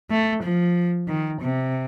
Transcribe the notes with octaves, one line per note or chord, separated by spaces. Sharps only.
A3
F3
D#3
C3